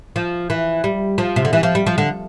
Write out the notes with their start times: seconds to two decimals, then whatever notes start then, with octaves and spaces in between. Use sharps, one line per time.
0.16 F3
0.50 E3
0.84 G3
1.18 F3
1.36 C3
1.45 D3
1.53 E3
1.63 F3
1.75 G3
1.86 F3
1.98 D3